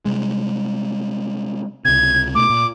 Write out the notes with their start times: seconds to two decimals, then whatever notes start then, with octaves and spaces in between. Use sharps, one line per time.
0.06 C3 G3 G#3
1.85 C#2 C3 G#6
2.35 B2 A3 D6
2.50 A#2